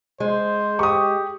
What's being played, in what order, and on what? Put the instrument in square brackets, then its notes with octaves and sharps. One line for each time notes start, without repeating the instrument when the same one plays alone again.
[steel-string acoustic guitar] G#3 [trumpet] C5
[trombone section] G4 [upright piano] C#6 D#6